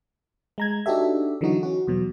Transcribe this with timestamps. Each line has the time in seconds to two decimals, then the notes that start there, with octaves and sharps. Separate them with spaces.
0.58 G#3 A#5 G#6
0.86 D4 D#4 F#4 G4 A4 E5
1.41 D3 E3 F#3 D#4 F#4
1.63 C#4 F#4
1.87 E2 B2 F#3